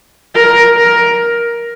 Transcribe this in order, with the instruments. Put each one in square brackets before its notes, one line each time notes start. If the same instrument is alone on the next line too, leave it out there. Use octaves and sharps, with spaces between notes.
[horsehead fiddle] A#4
A#4